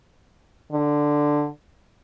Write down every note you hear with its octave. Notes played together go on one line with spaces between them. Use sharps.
D3